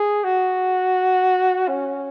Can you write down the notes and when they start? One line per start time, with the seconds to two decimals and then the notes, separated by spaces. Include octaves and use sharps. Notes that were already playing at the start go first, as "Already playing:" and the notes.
Already playing: G#4
0.24 F#4
1.68 C#4